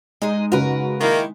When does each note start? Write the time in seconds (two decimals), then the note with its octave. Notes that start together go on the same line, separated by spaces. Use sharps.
0.22 G#3 D#4 G#4 D#5
0.52 C#3 F#4 A#4 B4
1.01 D#3 A#3 E4